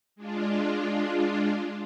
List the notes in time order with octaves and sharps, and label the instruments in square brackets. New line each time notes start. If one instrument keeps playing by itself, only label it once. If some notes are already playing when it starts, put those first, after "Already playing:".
[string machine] G#3 D4 F4